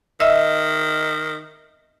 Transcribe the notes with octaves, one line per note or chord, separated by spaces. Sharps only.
D#3 D#5 E5 E6